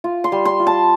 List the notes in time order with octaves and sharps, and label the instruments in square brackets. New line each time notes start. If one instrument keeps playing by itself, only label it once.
[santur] F4
C6
G3
C6
F4
A5